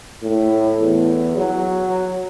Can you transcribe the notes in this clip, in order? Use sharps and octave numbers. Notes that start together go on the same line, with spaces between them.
A2
E2
F#3